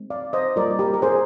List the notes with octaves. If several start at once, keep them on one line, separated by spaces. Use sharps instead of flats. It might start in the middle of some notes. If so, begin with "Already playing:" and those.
Already playing: G#3 C4
D5 F5
C5 D#5
G3 A#3 F4 A#4 D5
G4 A#4
A#4
G#4 C5